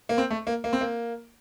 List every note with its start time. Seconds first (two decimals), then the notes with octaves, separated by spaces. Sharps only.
0.09 A#3
0.18 C4
0.30 A3
0.47 A#3
0.64 A#3
0.73 C4
0.81 A#3